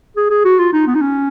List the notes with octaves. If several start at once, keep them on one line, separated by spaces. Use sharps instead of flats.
G#4
G#4
F#4
F4
D#4
B3
D#4
C#4